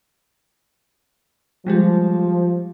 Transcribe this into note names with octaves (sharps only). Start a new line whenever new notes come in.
F3 G3 G#3 G4